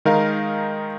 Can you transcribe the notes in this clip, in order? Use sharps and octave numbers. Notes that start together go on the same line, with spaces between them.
D#3 G#3 D#4 A#4 F5